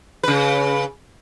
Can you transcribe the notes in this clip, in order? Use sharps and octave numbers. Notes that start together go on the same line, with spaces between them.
C#3 B4